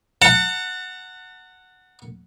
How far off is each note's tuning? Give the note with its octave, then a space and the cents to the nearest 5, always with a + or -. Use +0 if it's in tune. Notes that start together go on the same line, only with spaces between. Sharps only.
F#5 +0 A5 +40